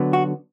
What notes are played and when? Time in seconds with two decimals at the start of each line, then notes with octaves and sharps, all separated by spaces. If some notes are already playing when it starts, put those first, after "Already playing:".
Already playing: D3 F#3 B3
0.13 F#4